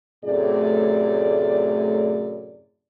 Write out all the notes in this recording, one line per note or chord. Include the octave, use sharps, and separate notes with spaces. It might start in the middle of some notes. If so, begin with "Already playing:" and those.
F#2 A2 C3 A3 G#4 D5